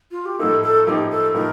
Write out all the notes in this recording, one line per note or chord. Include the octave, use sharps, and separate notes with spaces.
F4
G4
A2 F3 A#3 D#4 A4
A4
A2 F3 A#3 D#4 G4
A4
A2 F3 A#3 D#4 A#4